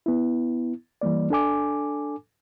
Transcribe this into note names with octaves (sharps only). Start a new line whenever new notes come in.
B3 E4
E3 G3 A#3 D5
D4 A4 G#5 D6